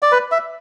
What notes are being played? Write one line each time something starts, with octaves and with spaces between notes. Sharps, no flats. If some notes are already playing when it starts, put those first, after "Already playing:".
D5
B4
E5